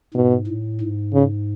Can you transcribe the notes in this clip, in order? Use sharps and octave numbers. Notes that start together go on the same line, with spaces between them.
G#2 B2
A2
G#2
C#3